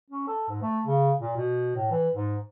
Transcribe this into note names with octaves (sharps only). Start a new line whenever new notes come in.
C#4
A4
G#2
A3
C#3
A#2
B2
A2
E3
G#2